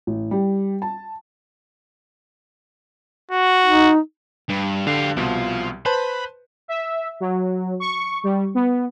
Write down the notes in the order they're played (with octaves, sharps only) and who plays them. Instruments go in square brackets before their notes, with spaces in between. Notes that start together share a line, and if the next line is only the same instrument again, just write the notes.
[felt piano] A1
G3
A5
[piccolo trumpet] F#4
[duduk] D#4
[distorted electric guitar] G2
[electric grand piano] D3 [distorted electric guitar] G3 F5
[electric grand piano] C2 B2 [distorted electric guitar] F3
[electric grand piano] B4 C5 A5 [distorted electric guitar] B5
[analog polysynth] E5
F#3
C#6
G3
B3